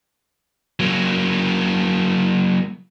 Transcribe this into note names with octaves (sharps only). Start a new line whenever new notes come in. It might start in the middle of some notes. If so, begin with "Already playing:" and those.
F#3 A#3